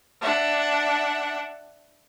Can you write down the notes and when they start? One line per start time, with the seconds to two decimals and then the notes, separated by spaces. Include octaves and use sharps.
0.21 D4 E5 F#5